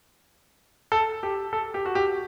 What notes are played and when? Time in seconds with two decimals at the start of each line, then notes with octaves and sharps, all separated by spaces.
0.92 A4
1.23 G4
1.53 A4
1.74 G4
1.86 F#4
1.95 G4